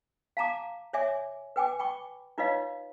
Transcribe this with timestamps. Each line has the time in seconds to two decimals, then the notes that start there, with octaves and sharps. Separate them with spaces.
0.37 F5 A5 A#5 D6
0.93 C#5 D5 E5 G#5 D6
1.56 B4 G5 G#5 D6
1.79 G5 B5 C#6 D6
2.38 D#4 F4 B4 C#5 D#5 F5